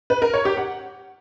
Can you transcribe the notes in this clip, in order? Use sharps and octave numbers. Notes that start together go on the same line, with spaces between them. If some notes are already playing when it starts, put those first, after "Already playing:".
B4
A#4
C#5
G4
F#5